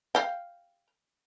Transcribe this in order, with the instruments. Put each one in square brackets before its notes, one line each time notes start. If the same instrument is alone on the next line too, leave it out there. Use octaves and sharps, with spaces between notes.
[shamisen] F5 G5